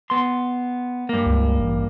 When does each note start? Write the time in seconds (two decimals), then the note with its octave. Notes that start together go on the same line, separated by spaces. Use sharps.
0.10 B3 C6
1.09 G2 A#3
1.25 C#2
1.58 A1